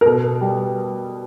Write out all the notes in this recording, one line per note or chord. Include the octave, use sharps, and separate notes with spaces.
A#4
B2 A4
G3